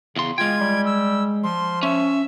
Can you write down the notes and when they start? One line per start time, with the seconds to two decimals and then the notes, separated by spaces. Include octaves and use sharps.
0.16 E2 C#3 C6
0.38 G#3 F4 G5 G#6
0.60 G3
0.85 E6
1.44 F3 C6
1.83 C#4 E5